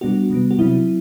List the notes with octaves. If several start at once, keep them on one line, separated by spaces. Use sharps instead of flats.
B2 G3 B3 D4 F#4
C3 G3 B3
F#4
C3 F#3 C4 E4